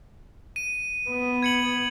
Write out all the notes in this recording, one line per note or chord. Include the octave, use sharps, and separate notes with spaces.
D#7
B3
G#6 C#7 F#7